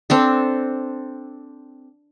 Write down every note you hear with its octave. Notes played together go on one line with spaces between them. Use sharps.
C4 D4 A4